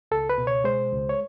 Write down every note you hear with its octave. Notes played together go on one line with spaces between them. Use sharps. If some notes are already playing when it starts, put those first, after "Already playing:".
C#2 A4
B4
B2
C#5
G#3 C5
C#2
C#5